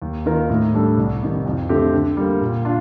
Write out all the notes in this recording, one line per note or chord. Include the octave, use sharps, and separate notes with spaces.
D#2
D#3 A#3 F4 A#4
A2
G3 D4 A4
C2
C3 D#3
F2
D3 A3 C4 G4
D3
G3 A#3
A#2
D4 F4